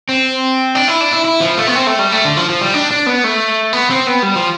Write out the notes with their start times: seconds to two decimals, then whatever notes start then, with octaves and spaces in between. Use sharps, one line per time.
0.09 C4
0.75 D4
0.88 E4
1.01 D4
1.12 E4
1.25 E4
1.41 F3
1.57 A3
1.67 B3
1.75 C4
1.87 A3
1.99 G3
2.12 A3
2.25 D3
2.37 F3
2.50 F3
2.61 G3
2.74 D4
2.91 D4
3.06 B3
3.24 A3
3.73 B3
3.90 C4
4.07 B3
4.23 G3
4.35 F3